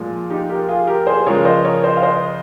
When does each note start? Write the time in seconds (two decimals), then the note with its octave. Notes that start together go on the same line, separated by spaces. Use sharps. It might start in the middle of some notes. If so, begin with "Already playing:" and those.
Already playing: A#2 F3 G#3
0.30 D#4 G4
0.49 G4 A#4
0.69 F4 G#4
0.87 G4 A#4
1.07 G#4 C5
1.27 C#3 F3 G#3 A#4 C#5
1.45 C5 D#5
1.65 A#4 C#5
1.84 C5 D#5
1.97 F5
2.03 C5 D#5